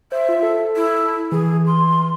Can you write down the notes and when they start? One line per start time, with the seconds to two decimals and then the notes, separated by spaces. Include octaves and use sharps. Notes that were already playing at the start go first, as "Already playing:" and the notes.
0.12 C5 E5
0.29 F4
0.43 A4
0.76 E4
1.32 E3 G#4
1.67 C6